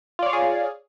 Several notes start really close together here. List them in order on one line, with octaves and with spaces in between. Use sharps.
F4 D5 C#5 F5 G#4